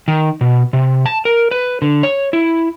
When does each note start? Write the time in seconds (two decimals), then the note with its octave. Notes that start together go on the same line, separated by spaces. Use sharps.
0.08 D#3
0.41 B2
0.73 C3
1.06 A5
1.25 A#4
1.51 B4
1.82 D3
2.03 C#5
2.33 E4